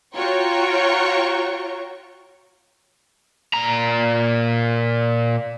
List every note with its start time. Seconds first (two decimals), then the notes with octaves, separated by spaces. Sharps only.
0.16 F4 F#4 C#5 G5 A#5 C#6
3.54 A#2 A#5